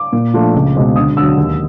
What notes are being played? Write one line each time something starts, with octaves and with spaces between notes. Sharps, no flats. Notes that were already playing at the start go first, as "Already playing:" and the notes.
Already playing: D6
A#2
F3 A3 D4 F4
C#2
B2 G#3 C4
D2 D#6
D3 F#3 E6
D#2